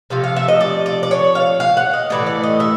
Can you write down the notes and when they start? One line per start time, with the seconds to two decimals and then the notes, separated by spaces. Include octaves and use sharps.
0.10 C3 F3 A3 F5
0.24 F5
0.36 E5
0.48 D#5
0.61 D5
0.86 D5
1.03 D5
1.11 C#5
1.35 F5
1.60 F5
1.77 F#5
1.93 D#5
2.10 A2 E3 A3 D5
2.27 D5
2.43 D#5
2.60 E5